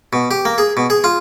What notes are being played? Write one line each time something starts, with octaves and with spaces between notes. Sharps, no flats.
B2
G4
A#3
G#4
B2
G#4
F4